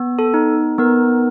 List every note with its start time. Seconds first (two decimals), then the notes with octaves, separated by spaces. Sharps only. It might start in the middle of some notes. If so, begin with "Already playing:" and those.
Already playing: B3
0.19 A4
0.34 D#4
0.78 B3 A#4